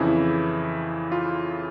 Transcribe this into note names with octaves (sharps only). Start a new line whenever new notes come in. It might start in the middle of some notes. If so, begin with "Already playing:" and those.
Already playing: F2 C#3 E3 E4
F4